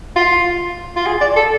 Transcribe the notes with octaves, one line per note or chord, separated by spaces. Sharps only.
F4
F4
G#4
D5
A4